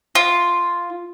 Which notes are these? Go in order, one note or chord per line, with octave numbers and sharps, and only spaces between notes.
F4